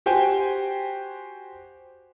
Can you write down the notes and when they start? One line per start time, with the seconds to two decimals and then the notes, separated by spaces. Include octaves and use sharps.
0.06 F#4 G4 C5 G5 G#5